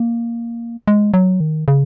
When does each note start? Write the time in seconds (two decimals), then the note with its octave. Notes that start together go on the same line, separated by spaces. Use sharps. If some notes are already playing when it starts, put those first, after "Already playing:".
Already playing: A#3
0.88 G#3
1.14 F#3
1.40 D#3
1.68 C#3